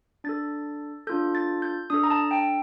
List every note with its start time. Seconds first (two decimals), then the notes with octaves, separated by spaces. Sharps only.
0.24 D4 A4 A6
1.07 D4 F4 A4 G6
1.35 A6
1.62 G6
1.90 D4 A4 D#6
2.04 A#5
2.10 A5
2.31 G5